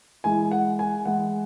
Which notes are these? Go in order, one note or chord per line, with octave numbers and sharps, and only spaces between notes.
E3 G#3 E4 G#5
F#5
G#5
E3 G#3 E4 F#5